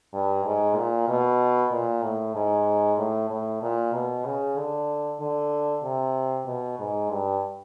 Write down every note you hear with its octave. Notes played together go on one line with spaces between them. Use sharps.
G2
G#2
A#2
B2
A#2
A2
G#2
A2
A2
A#2
B2
C#3
D3
D3
C3
B2
G#2
G2